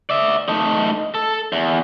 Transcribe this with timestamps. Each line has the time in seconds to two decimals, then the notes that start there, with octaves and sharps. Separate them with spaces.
0.10 D5 E5
0.48 A3 D#4
1.15 A4
1.52 E2